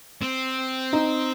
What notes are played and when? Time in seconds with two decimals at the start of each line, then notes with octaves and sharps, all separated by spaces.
0.22 C4
0.93 D#4